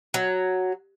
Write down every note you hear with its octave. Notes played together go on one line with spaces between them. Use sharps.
F#3